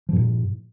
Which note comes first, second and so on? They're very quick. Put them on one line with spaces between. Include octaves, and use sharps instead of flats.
F3 G2 A#2